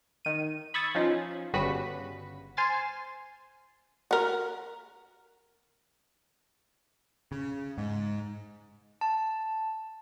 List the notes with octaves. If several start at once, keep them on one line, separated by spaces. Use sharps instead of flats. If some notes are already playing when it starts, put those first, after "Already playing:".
D#3 D#7
B5 C#6 D#6 E6 G#6 A6
F3 C#4 D#4 F4
G1 C#3 G3 F#4 B4 B6
C5 G#5 C6 F6 A6
F#4 A#4
C#3
G#2
A5